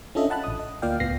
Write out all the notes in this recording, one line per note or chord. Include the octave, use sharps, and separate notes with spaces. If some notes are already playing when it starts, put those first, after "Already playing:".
C#4 D4 F4 A4 D#5 E5
F#5 A5 B5 F#6
A1 D#6
D#5
D2 A#3 F4 D5 F5 G5
C#2 A2 B3 A#6 C7